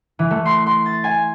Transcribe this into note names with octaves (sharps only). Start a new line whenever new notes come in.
E3
A3
C6
C6
A6
G#5